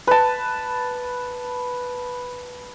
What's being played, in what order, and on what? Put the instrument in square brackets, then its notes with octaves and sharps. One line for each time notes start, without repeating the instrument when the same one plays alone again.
[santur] B4 A5